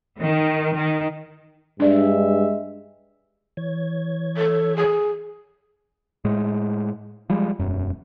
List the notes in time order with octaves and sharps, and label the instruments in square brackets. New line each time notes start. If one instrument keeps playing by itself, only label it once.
[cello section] D#3
D#3
[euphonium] G2 [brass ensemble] G#3 E5 [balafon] D4 D5
[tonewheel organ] E3 C#5 G#6
[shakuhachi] A4
G#4
[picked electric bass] A2 G#3
F3 G3 G#3
E1 F#2